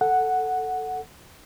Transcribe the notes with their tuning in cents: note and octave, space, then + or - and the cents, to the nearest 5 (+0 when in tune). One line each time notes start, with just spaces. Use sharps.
A4 +5 F#5 +0